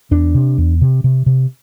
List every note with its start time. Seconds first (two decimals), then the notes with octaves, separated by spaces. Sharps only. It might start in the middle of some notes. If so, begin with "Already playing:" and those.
0.11 E2 D4
0.34 C3
0.58 E2
0.81 C3
1.04 C3
1.26 C3